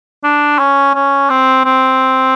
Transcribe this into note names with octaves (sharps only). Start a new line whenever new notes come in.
D4
C#4
C#4
C4
C4